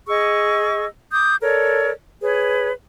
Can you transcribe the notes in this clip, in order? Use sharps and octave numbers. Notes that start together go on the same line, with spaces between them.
G#4 D#5 C#6 E6
D6 D#6 G6
A4 A#4 C#5 D5
G#4 B4 C#5